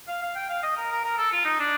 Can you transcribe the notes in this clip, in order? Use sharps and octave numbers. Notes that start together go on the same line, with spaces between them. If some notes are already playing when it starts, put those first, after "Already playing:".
F5
F5
G5
F5
D#5
A#4
A#4
A#4
A4
F4
D#4
D4